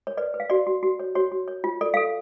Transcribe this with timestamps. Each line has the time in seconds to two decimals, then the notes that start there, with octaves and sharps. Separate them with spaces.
0.07 C#5
0.17 B4 D5
0.34 B4
0.40 F5
0.50 F#4 D5
0.67 F#4
0.83 F#4
1.00 C#5
1.15 F#4 C#5
1.32 F#4
1.48 C#5
1.64 F4
1.81 A4 D5
1.94 A4 F5